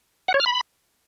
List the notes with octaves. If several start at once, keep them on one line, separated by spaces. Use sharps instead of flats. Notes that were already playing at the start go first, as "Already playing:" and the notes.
F#5
C#5
F6
B5